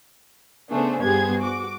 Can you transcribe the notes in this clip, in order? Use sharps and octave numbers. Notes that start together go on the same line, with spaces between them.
C#3 A3 B3 D4 G#4 C5
G2 B3 G4 G#4 C5 G#6
F#4 D6